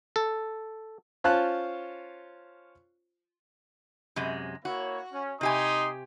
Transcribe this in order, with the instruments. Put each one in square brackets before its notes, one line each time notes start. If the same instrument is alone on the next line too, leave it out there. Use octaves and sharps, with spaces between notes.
[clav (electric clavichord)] A4
[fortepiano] C#4 F4 C5 F5 A5 F#6
[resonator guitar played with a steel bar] F#2 C3 G#3
[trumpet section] A#3 E4 C#5 [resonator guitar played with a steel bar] F#4
[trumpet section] C#4
[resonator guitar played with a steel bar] C3 G4 G#5 [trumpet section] D#4 C6 D#6